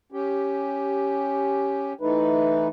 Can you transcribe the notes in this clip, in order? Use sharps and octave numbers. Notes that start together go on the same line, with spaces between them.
C#4 G4
E3 A3 D#4 B4